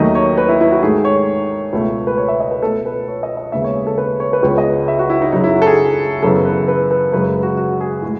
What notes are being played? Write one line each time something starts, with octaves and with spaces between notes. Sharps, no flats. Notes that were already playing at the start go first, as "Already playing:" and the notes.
Already playing: D#2 D#3 F#3 A3 D#5
C#5
B4
E4
E4
F#4
G#2 D#3 A3 G#4
C#5
C#2 B2 A3
B4
C#5
E5
D#5
B4
B2 A3 A4
B4
C#5
D#5
D#5
D#2 C#3 G#3 B3 E5
C#5
G#4
A4
B4
C#5
B4
C#2 C#3 G#3 B3 C#5
D#5
E5
F#4
E4
D#4
F#2 C#3 F#3 D#4
E4
F#4
A4
G#4
F#2 C#3 E3 B3 A4
B4
B4
B4
F#2 C#3 G#3 B4
F#4
F#4
G#4
A2 G#3